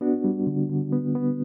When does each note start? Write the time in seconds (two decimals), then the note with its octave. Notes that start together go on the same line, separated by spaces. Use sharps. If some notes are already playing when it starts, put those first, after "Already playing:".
0.01 B3 D4 F#4
0.24 G3
0.47 D3
0.70 D3
0.93 B3
1.15 B3